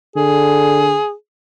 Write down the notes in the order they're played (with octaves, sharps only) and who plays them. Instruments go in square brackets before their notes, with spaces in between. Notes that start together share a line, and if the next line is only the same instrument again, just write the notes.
[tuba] D3 [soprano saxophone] G#4